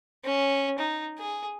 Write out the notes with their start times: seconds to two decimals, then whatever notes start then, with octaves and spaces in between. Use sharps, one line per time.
0.24 C#4
0.79 D#4
1.18 G#4